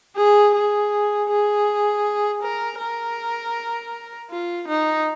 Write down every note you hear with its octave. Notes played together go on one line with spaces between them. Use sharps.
G#4
G#4
G#4
A#4
A#4
F4
D#4